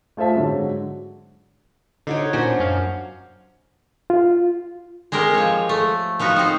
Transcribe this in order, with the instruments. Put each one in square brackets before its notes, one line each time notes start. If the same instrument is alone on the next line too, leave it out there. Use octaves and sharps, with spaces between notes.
[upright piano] A3 F4 C5 E5 A5
G#2 D3 F#3
[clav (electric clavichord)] D3 [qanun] D#4 F#4 C#5
[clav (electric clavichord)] A#2 C#4 F#4 [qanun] F#3 D4 C5
[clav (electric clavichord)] F#2 C#4 F5
[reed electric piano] F4
[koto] G#3 C4 G4 A#4
F3 C#5
A3
F3 B3 D#4 F#4
C4 D#4